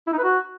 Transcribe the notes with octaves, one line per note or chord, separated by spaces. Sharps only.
E4
D#4
B4
F#4